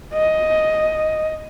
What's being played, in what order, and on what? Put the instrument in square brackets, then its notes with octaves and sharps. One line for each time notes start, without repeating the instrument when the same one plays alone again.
[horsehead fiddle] D#5